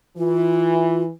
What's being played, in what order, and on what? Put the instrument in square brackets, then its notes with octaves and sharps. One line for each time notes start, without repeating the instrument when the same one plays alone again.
[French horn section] E3 [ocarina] F4